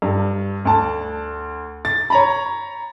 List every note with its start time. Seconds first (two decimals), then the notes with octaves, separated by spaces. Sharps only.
0.02 G2
0.65 D2 A5
1.85 A6
2.10 C#5 A#5 B5